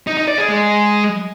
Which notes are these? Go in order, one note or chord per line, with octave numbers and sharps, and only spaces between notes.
D#4
D#4
D5
G#4
G#3